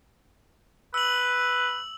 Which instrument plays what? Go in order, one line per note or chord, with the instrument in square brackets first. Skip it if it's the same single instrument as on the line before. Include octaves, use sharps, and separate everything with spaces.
[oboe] B4 [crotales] E6 F#7